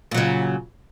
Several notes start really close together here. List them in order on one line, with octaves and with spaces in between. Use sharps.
A#2 F#3 C#3